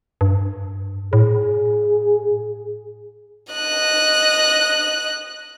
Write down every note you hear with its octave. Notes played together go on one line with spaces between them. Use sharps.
G2
A2 G#4
D#5 F#6